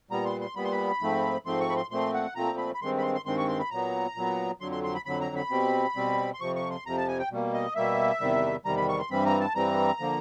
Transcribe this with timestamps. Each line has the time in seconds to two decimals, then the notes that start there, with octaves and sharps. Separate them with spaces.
0.10 A#2 G3 B3 A#5
0.25 C6
0.41 C6
0.55 A#2 G3 B3 B5
0.64 C6
0.72 B5
1.01 G#2 F3 A3 C4
1.46 G#2 F3 A3 C4 C6
1.60 C#6
1.70 B5
1.76 C6
1.90 A#2 F3 A3 C4 C6
2.14 F#5
2.35 A#2 F3 A3 C4 A#5
2.58 B5
2.74 B5
2.81 G2 D#3 G#3 C4 C6
2.98 B5
3.03 C6
3.15 C6
3.26 G2 D#3 G#3 C4 C6
3.37 C#6
3.48 C6
3.60 B5
3.70 A#2 F#3 B3 A#5
4.16 A#2 F#3 B3
4.61 F2 D3 F#3 C6
4.72 C6
4.83 C6
4.95 B5
5.06 F2 D3 F#3 B5
5.21 A#5
5.36 B5
5.50 B2 G3 C4
5.96 B2 G3 C4
6.34 C6
6.41 F2 C3 F3 C#6
6.56 C#6
6.70 C6
6.86 F2 C3 F3 A#5
6.97 A5
7.08 G#5
7.19 G5
7.31 B2 G3 A#3
7.54 D#5
7.75 B2 G3 A#3 E5
8.20 E2 C3 D#3 G3
8.65 E2 C3 D#3 G3 A#5
8.77 B5
8.89 C#6
8.99 C6
9.10 G2 E3 G3 C4 B5
9.26 A#5
9.40 A5
9.55 G2 E3 G3 C4 A#5
10.00 D3 F3 A#3